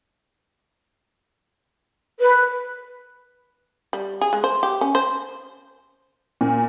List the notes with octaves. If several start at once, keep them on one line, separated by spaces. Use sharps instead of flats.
B4
G3
G#4
G#3
C5
G4
C#4
C5
A#2